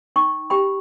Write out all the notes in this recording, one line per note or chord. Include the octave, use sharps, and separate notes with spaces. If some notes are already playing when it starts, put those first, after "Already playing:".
D#4 G5 C#6
G4 G5 B5